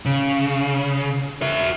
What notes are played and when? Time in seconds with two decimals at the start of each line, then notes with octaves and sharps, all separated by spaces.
0.06 C#3
1.42 F#4 E5